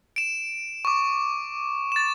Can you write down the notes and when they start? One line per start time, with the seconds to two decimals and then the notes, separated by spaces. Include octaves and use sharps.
0.16 D7 E7
0.85 C#6 D6
1.92 A6 E7